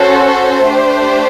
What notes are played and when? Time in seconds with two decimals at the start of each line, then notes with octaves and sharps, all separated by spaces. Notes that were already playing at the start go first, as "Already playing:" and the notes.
Already playing: C#4 F#4 A4 C5
0.29 C5
0.68 A3 D4 G4